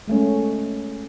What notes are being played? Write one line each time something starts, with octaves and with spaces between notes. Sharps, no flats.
G#3 A3 C#4